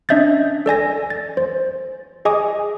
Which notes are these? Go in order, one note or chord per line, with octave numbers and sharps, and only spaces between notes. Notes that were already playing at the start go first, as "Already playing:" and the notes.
C#4 D4 D#5 E5 G6 A6
A4 D5 G#5 A#6
A6
C5
G#4 D#5 G#5 D6 D#6